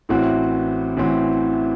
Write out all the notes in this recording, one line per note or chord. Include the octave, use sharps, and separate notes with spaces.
A1 A2 E3 C4 F#4
A1 A2 E3 C4 F#4